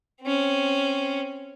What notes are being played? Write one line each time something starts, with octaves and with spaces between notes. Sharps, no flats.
C4 C#4